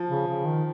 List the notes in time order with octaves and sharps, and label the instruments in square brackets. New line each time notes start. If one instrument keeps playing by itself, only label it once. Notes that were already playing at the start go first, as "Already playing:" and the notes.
Already playing: [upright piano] F3
[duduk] C#3
C#3
D#3